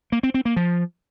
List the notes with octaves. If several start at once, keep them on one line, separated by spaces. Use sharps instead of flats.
A#3
C4
C4
A#3
F3